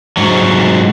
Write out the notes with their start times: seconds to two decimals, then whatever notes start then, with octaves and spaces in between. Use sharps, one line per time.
0.17 G#2 F#3